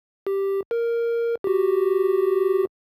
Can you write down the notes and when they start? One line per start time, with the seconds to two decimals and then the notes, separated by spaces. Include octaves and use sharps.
0.27 G4
0.71 A#4
1.44 F#4 G4